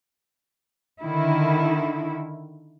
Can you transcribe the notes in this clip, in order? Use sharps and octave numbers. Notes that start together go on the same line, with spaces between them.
D3 D#3 E4